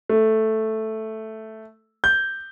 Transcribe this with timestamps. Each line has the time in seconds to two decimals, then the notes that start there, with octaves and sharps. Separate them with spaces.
0.09 A3
2.04 G6